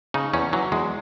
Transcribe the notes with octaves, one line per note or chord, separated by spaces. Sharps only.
C#3 D#4
E2 C#4
E3 F#3
E2 G#3